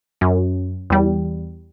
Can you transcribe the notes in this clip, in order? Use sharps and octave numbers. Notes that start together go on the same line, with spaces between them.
F#2
E2 G3